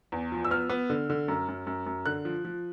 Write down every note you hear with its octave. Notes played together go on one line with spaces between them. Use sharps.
E2
F3
E6
B3 F6
B3
D3
D3
F#2
F#2
F#2
F#2
D3 F#6
F3
F3